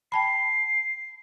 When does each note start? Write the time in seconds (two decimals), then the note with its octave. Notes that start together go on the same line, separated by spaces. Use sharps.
0.12 G5 A5 B5 C7